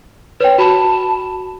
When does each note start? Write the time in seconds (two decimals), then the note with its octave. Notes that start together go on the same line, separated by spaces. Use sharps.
0.40 B4 C#5 G5
0.58 F#4 A5 B5